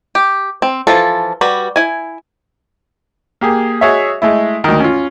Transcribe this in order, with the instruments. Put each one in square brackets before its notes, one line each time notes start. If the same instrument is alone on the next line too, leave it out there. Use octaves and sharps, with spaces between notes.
[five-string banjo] G4
C4
E3 F3 F4 A4
G3 F#4 B4
E4 G#5
[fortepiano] A#3 G4 G#4
F#4 G#4 C#5 D#5 E5
G#3 A3 E4
D2 D#3
C#4 F4